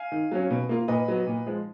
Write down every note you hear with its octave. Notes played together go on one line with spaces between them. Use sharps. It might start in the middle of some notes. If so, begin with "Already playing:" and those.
Already playing: F5 G#5
D#3
F#3 C#4
B2
A#3 F4
A#2 B4 D#5
F#3 B3
A#2
F3 G#3